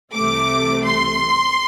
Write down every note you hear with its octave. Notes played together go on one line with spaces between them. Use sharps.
C2 C3 E3 A3 D6
C6